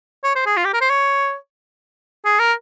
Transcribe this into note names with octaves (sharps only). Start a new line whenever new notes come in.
C#5
C5
G#4
F4
G4
A#4
C5
C#5
G#4
A#4